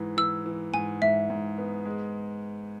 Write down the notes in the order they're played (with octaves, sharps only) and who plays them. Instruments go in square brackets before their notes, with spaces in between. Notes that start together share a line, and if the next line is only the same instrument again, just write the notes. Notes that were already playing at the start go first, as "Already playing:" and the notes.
Already playing: [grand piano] G#2 E3
[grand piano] E3 [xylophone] E6
[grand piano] E3
[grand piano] G#2 [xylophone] G#5
[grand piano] G#2 [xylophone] E5
[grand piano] G#2
B3
G#3